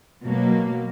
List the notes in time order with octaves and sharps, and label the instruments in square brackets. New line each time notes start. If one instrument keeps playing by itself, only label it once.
[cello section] B2 F#3 A#3